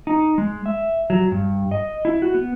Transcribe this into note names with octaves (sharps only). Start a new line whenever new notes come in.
D#4
G#3
E5
F#3
G2
D#5
E4
F#4
B3